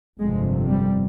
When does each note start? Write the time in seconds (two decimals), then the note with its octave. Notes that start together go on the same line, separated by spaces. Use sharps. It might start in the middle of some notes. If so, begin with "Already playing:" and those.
0.19 G1 F2 C3 G#3
0.68 G3